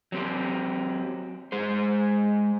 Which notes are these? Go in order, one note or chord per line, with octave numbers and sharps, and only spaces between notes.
F#3 C4 G4
G#3 G#4 C5